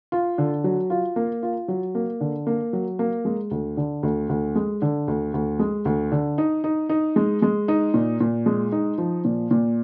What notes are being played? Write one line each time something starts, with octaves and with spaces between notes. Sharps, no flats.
F4
D3
F#3
F4
A#3
F4
F#3
A#3
D3
A#3
F#3
A#3
G#3
D2
D3
D2
D2
G#3
D3
D2
D2
G#3
D2
D3
D#4
D#4
D#4
G#3
G#3
D#4
A#2
A#2
G#3
D#4
F3
A#2
A#2